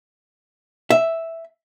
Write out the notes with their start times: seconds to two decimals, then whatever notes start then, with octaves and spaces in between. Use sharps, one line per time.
0.90 E5